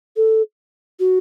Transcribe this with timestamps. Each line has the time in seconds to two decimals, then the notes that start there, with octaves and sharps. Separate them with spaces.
0.16 A4
1.00 F#4